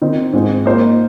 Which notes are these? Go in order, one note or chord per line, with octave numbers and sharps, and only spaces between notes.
D#3 C4 D#4
G#2 G#3 C4
A#3 D#4 C5 D#5